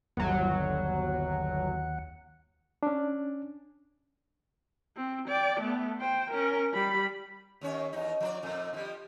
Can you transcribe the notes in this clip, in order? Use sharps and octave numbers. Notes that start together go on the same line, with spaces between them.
G1 D#2 F#3 F#5
C#4 D4
C4
D5 G5
A3 B3
C5 G5
C#4 A#4
G3 B5
D#2 C#4 C#5
E2 D#4
F3 B4 D5
F2 A#2
D#3 F3 G3